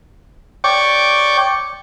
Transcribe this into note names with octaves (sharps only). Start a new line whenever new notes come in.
C#5 D5 G5 C#6 D6